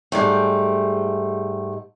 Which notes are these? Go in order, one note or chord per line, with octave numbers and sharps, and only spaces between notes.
G#2 G3 A3